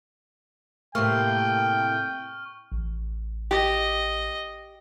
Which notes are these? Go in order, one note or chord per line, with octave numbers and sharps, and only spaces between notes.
A2 C3 A#3 G5 C#6 F6
A1
G4 D#5